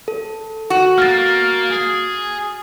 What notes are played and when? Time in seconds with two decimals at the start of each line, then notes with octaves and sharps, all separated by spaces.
0.08 A4
0.70 F#4
0.98 A#3 F6 A6
1.70 G#4